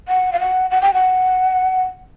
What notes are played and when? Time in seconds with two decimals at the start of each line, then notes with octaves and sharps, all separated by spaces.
0.08 F#5
0.33 F5
0.40 F#5
0.71 F#5
0.82 G5
0.94 F#5